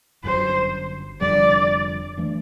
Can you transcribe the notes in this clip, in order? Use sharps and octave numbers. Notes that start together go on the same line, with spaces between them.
G1 F#2 D3 F#3 C5
F1 F2 D3 G3 D5
E3 A3 D4